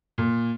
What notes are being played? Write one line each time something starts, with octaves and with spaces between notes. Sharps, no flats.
A#2